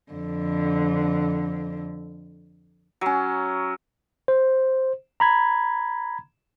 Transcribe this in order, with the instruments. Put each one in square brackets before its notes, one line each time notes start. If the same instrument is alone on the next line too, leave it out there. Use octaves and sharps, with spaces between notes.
[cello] F2 D3
[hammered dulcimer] F#3 C#4
[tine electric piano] C5
A#5 B5 G#6